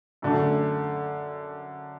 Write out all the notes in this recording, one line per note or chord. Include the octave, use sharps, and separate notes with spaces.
F#2 D3 A3